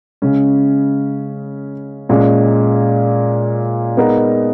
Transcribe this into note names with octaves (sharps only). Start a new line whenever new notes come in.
C#3 G#3 C#4
A#2 G#3 C#4
G#3 B3 D#4 A#4